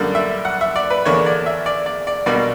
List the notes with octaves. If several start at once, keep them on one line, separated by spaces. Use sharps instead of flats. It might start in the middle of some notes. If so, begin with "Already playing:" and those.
Already playing: F#2 D3 G3 A#3 D5
E5
F#5
E5
D5
B4
E2 D3 A#3 D4 C#5
D5
E5
D5
D5
D5
B1 B2 G3 A#3 D4 D5